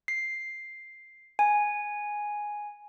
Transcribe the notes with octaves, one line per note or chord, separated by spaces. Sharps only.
C7
G#5